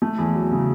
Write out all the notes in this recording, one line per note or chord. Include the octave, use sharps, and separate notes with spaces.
A3
E2
F#3
C#3